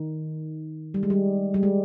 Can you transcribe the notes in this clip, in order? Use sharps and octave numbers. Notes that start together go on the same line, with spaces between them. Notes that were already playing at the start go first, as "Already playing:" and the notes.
Already playing: D#3
G3
G#3
G3
G3
G#3